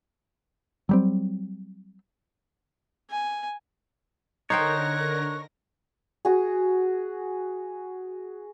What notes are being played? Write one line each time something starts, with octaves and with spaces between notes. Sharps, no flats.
F#3 G3 C4
G#5
D3 D#4 A#4 C5 C#5 G5 F#6 A#6
F#4 G#4